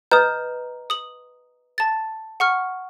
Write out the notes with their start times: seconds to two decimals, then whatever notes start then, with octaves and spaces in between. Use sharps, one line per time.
0.11 B4 D#5 A#5 D#6 G6
0.90 D#6 F#7
1.78 A5 A6
2.40 F#5 C#6 F6